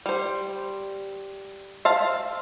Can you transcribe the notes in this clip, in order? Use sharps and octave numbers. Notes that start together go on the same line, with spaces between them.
G3 C5
C5 E5 F5 A5